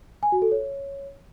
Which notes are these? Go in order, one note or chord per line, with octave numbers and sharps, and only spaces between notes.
G#5
F#4
A4
C#5